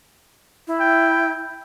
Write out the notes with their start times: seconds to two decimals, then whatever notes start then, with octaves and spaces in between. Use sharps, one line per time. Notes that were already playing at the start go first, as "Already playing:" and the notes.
0.67 E4
0.80 G5